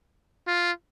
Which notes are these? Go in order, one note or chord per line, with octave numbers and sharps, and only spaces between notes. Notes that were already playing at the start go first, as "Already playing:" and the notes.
F4